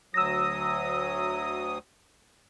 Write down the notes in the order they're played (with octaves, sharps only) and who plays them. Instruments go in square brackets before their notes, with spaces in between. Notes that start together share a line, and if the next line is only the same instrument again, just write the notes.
[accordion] D2 F#3 D#6 [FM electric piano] E6 A#6